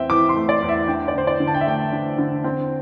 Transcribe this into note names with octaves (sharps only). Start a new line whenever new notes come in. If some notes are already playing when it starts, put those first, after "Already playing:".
Already playing: E2 C4 E5 G5
E3 D6
C6
A3
D5
E2
E5
D4 G5
D5
D3 C5
D5
D3
A5
G5
E5
A3 G5
D4
D3
C4